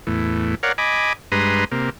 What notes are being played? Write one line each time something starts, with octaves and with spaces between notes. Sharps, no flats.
E2 A2
A#4 C#5 D5 F5 F#5
D#5 G#5 B5 D6
G2 G#3 B4 A#5 C6 D#6
C3 A#3